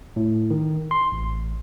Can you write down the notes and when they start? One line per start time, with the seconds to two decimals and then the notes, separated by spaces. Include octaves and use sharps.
0.16 A2
0.50 D#3
0.91 C6
1.12 A1